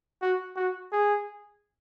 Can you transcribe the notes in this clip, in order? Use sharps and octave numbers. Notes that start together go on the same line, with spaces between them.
F#4
F#4
G#4